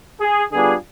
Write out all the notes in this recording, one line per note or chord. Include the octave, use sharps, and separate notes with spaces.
G#4
D3 G3 B3 D4 F4 G#4